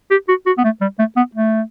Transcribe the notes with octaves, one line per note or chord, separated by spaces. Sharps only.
G4
F#4
F#4
B3
A3
G3
A3
B3
A3